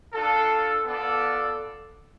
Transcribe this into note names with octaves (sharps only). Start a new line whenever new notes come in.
D4 F4 A4
B3 F4 A4 D5